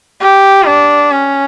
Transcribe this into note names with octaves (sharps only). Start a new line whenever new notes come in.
G4
D4
C#4